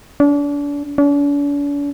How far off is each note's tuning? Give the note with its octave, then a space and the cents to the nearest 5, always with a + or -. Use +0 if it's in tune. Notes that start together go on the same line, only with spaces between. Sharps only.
D4 -35
D4 -45